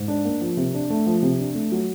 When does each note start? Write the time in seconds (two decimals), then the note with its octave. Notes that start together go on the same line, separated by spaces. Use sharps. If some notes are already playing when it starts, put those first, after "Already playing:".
Already playing: G#2
0.08 D4
0.25 A#3
0.41 F3
0.57 C3
0.74 D4
0.90 A3
1.07 F3
1.22 C3
1.38 D4
1.55 A3
1.72 F#3